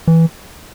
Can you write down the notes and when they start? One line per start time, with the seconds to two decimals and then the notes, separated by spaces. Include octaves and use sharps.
0.08 E3